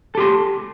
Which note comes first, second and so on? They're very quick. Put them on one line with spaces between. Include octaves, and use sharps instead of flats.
A4 G4 C6